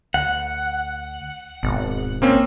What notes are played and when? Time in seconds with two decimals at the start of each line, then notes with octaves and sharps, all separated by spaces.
0.14 D2 F#5
1.63 D1 G#1 B2
2.22 A#3 C4 C#4